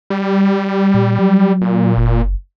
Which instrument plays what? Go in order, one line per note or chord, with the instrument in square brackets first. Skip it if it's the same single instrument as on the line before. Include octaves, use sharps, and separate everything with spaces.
[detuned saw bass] G3
[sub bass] A#2
F#3
[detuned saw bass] A#2
[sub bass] F#1